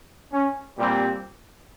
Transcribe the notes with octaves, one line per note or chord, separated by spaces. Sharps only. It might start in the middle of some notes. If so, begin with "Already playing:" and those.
C#4
A#2 G3 C4